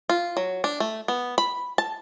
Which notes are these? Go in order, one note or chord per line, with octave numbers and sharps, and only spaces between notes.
F4
F#3
D4
A3
B3
B5
A5